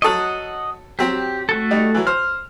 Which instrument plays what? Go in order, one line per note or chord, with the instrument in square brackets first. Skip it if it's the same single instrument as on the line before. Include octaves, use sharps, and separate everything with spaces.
[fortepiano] F#3 A4 C#6 [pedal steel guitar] D#5 F#5
[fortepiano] F#3 C4 [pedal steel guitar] G4
[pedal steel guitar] A3 F#4 A4
[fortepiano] G3 D#4
E3 F#3
[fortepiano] C5 [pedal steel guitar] F6